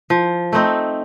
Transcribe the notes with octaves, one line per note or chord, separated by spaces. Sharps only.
F3
A3 C4 D#4